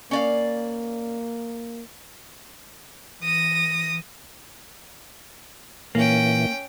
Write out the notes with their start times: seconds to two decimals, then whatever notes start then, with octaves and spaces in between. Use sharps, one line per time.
0.11 A#3 C#4 D5 F5
3.21 E3 D#6 A#6
5.95 A#2 E3 A#3 C#4 G5